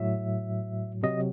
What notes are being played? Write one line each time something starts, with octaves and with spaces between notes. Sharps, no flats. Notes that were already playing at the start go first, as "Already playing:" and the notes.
Already playing: A2 F#3 E5
C3 F#3 D#5